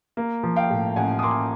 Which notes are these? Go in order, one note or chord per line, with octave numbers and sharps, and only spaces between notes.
A#3
F3
F5 G5
A2
A1 F#5 G#5
D#6
A#3 C6 D6